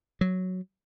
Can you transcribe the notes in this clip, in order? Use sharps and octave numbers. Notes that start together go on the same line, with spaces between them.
F#3